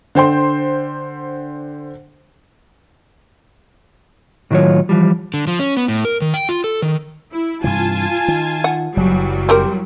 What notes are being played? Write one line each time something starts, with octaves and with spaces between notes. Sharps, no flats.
D3 C5 G5 C6
A2 D#3 F#3 F4 C#5
E3 F3 G3
D3
F3
C#4
B3
A2
A#4
D#3
G5
F4
A4
D#3
E4
G2 C3 E3 F4 G#5 A5
D#3
F#5
F#1 E3 F#3 G3
C4 G4 A#4